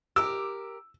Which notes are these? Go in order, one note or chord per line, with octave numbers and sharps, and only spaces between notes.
G4 A#4 E6